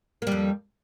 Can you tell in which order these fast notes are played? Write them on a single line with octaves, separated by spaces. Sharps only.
A#3 G3 F2